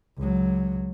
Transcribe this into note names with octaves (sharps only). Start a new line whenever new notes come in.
C#2 F#3